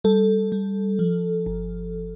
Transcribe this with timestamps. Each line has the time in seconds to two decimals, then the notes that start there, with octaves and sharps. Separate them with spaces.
0.04 G3 A4
0.52 G3
0.99 F3
1.46 G1